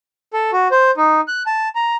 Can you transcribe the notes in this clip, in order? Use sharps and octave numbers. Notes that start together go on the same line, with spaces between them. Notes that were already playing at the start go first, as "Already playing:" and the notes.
A4
F#4
C5
D#4
F#6
A5
A#5